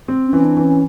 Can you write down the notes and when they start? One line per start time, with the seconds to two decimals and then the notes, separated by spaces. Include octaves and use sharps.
0.08 C4
0.27 C#4
0.33 E3
0.45 D4
0.57 E3
0.63 C#4